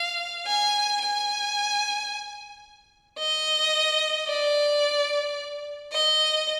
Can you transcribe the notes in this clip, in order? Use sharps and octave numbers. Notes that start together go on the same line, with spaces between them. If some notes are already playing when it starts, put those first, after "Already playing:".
Already playing: F5
G#5
G#5
D#5
D5
D#5